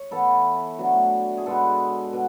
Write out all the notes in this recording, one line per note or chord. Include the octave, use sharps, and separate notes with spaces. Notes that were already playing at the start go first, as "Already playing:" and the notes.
Already playing: C#5
E3 B3 E4 A4
B2 F#3 A3 D4
G#4
B2 G#3 B3 A4
B2